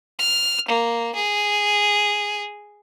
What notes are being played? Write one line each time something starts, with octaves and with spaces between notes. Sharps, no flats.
F6
A#3
G#4